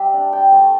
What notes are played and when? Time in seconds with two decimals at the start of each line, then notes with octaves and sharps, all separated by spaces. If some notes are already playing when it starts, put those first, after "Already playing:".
Already playing: G3 D5 E5
0.13 D4
0.33 G5
0.52 A3 A5